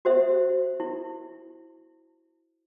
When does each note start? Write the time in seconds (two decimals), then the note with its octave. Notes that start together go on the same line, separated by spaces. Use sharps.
0.05 F#4 C5 E5
0.80 E4